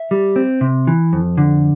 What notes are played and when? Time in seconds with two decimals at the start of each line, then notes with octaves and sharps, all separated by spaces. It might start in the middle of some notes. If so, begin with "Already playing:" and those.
Already playing: E5
0.11 G3
0.36 C4
0.61 C3
0.87 E3
1.13 F2
1.38 D3